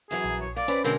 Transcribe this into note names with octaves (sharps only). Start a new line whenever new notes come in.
F#2 E3 F#3 G#4
A#1
C#5
A#3 D5
C4 C#4 B4 B5
B2 D3 G#3 C4 A#4